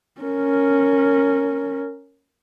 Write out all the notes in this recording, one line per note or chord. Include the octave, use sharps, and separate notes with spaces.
C#4 A#4